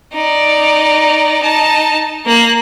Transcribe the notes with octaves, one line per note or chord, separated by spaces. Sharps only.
D#4 D5
D#4 A5
A#3 F#6